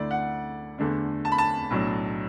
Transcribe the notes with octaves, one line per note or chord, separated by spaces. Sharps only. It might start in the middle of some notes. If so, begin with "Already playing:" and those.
Already playing: D2 D3 A3 E4 D5
F#5
E2 D3 A3 D4
A5
B5
A5
B1 A2 F#3 D4